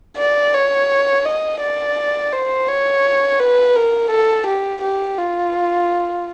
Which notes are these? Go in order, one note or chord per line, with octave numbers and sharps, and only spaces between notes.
D5
C#5
D#5
D5
C5
C#5
B4
A#4
A4
G4
G4
F4